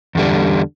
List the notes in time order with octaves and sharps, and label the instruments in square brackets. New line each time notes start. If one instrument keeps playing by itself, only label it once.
[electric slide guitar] E2 D3 G3